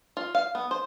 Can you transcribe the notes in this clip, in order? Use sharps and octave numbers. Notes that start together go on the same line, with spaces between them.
F4
F5
B3
C5